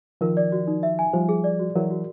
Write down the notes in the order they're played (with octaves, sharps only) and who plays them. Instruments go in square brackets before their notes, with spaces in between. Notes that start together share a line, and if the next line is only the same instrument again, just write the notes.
[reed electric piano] D#3 F3 [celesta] A#4
[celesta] D5
F#4
D#4
E5
G#5
[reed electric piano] F3 G3 [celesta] C5
[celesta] G#4
D5
F#4
[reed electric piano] E3 F#3 [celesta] A#4
[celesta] F#4